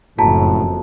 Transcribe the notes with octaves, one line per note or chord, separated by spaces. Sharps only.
F#1 F2 A2 F#4 A5 A#5